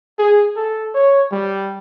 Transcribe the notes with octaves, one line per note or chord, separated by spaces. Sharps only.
G#4
A4
C#5
G3